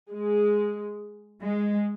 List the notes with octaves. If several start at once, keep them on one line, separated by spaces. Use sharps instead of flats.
G#3
G#3